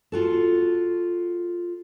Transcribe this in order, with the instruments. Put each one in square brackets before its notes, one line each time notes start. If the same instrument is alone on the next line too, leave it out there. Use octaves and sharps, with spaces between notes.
[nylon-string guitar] F4 F#4 A4